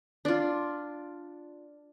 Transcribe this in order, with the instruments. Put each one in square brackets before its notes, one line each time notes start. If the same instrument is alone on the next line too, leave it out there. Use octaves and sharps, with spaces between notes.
[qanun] D4 F4